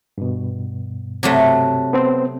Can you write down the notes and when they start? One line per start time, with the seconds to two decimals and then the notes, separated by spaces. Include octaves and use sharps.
0.18 G2 B2
1.23 C3 F#3 A3
1.93 B3 C4 C5